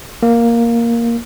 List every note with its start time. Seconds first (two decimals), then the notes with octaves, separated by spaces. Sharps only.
0.23 A#3